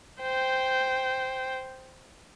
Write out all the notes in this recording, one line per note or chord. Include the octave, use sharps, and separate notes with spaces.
C5 G5